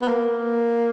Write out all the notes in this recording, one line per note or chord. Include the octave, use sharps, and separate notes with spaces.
B3
A#3